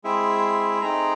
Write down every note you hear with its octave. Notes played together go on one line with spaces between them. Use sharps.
G#3 C4 E4 G#4 E5
A3 C4 D#4 G#4 A#5